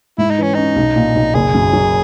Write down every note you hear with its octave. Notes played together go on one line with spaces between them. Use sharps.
G#2 E4
D#4
E3 C#4
C#4 D#4
B1
A#2
B1
F#1 G#4
F#2
F#3